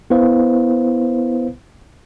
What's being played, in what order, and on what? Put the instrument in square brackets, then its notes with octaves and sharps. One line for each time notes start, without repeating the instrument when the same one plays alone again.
[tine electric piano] B3 E4 B4 C5 F5